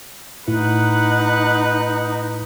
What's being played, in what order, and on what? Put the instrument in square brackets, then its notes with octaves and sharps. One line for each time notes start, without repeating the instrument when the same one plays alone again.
[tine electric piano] A2 E4 [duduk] D#4 [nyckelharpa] B4 F#5